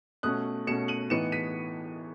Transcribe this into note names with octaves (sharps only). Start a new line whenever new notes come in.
B2 A3 C#4 D#6 F#6
B2 A3 C#4 C#7 E7
D#7 F#7
A2 E3 B3 D#4 C#7 E7
B6 D#7